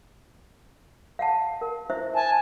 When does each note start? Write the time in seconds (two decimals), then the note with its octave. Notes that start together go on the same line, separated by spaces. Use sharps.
1.19 F5 F#5 A5
1.61 A#4
1.90 E4 C5 E5
2.16 G#5 A5